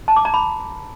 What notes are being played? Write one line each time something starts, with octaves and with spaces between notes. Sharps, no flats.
A5
D6
A#5
B5